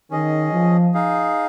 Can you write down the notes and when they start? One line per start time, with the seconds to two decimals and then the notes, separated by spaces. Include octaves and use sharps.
0.11 D#3 C#4 G#4 D#5
0.52 F3
0.94 D#4 G#4 F5